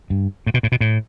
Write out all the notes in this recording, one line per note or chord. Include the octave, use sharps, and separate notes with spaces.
G2
A2
B2
A2
B2
A2